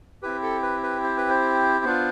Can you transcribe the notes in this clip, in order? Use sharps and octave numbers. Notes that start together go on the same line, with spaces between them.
C4 E4 G4 B4
A4
B4
B4
C5
B4
C5
B3 D4 F4